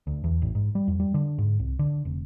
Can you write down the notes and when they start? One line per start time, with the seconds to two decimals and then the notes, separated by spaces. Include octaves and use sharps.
0.07 D2
0.24 E2
0.42 A1
0.55 G#2
0.75 G3
0.88 F2
1.00 G3
1.14 D3
1.38 G#2
1.59 C2
1.79 D3
2.05 F1